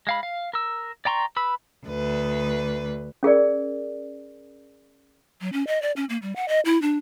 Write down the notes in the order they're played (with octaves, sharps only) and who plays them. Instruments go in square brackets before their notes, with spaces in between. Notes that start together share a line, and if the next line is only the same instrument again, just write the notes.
[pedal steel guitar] G#3 F5 B5
F5
A#4 E6
D5 G5 A#5 C6 C#6
B4 B5 E6
[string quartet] D2 B4
[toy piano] C#4 G#4 A#4 D5
[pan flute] F#3
C#4
D#5
D5
C#4
A#3
G3
F#5
D#5
E4
D4